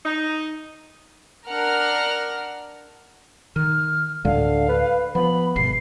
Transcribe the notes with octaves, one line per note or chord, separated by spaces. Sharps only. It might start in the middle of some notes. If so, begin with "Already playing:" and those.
D#4
D4 A#4 F#5 F6
D#3 F6
D2 A2 D3 G#3 F5
B4
F3 B3 B5
G1 B2 C7